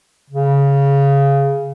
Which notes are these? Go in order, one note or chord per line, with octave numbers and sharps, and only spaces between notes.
C#3